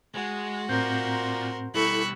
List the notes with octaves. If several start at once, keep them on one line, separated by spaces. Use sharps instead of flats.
G#3 F#4
A2 C4 F4 A#4 C5 D5 G6
B2 G3 E4 A4 B5 C#6 E6 F#6